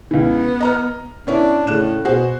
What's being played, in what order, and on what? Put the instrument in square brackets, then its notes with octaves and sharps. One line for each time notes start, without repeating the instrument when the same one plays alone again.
[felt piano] C#2 E3 [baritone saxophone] B3
[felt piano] D#5 A#5 F6
[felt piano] B3 C#4 E4 [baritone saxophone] D4
[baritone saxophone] A2 [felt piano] C#3 F#6 E7
[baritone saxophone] B2 [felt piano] F#4 G#4 C5